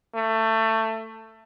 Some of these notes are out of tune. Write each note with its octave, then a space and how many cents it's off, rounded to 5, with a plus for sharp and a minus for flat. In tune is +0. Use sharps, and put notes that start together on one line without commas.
A3 +20